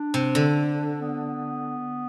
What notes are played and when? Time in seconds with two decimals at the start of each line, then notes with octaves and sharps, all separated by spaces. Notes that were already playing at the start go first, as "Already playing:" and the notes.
Already playing: D4
0.14 C3
0.35 D3
1.01 B3